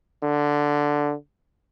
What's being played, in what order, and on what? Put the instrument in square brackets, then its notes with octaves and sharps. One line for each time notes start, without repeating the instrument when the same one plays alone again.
[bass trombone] D3